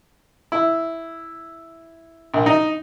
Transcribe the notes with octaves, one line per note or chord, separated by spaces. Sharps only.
E4
A#1
D#4